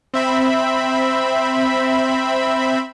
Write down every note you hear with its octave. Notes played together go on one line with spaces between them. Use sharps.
C4 E5 B5